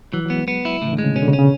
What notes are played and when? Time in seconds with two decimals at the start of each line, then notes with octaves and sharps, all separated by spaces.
0.13 E3 F#3
0.25 F#3
0.30 B3
0.36 G#3
0.48 B3
0.65 E4
0.82 A2 C#3
0.88 E3
0.93 D3
0.98 G#3
1.04 C#3
1.16 B2 C#4
1.22 D3
1.28 C#3
1.33 C#4
1.39 C#3